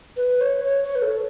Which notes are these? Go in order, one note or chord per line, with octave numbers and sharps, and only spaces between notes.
B4
C#5
C#5
C#5
B4
A4